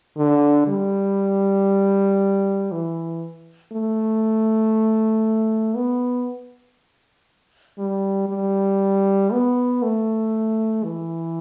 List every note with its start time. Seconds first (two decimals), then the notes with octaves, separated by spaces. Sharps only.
0.18 D3
0.68 G3
2.72 E3
3.73 A3
5.76 B3
7.79 G3
8.30 G3
9.32 B3
9.83 A3
10.84 E3